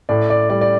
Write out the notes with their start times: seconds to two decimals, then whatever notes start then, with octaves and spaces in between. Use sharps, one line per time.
0.09 A2 D5
0.30 D5
0.50 G3 D5
0.61 D5